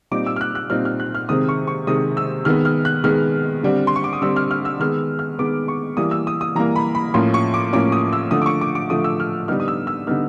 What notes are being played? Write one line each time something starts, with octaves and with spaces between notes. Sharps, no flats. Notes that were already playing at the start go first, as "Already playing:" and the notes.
A#2 G3 C4 D#4 D6
E6
F6
F#6
F#6
A#2 G3 C4 D#4 F6
F6
F#6
F6
C3 D#3 G#3 C4 D#6
C#6
C#6
C3 D#3 G#3 C4 D#6
E6
D#3 G#3 B3 F6
F6
F#6
D#3 G#3 B3 F6
D3 G3 C4
C6
C#6
D6
D#6
D3 G3 C4 E6
F6
F6
E6
D#3 G#3 B3 F6
F6
D#3 G#3 B3 D6
C#6
E3 G3 A#3 D#6
E6
D#6
D#6
E3 G3 A#3 A#5
B5
B5
A2 F3 A#3 C#4 C6
C#6
D6
A2 F3 A#3 C#4 D6
D#6
E6
D3 F3 A3 D#6
D6
C#6
D6
D6
D3 F3 A3 D#6
E6
F6
D3 G3 B3 D#4 F6
D#6
E6
E6
D3 G3 B3 D#4 F6